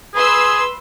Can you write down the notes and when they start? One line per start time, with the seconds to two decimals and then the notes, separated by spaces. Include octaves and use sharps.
0.14 G#4 B4 C6 E6